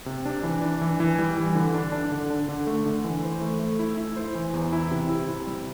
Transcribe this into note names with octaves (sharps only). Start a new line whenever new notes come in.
C3
D4
E3
D4
E3
E3
G3
E3
D3
D4
D4
D3
D4
D3
A3
D3
E3
C5
A3
A3
E4
E4
C5
E3
E2
E4
C3
E4
C3
G3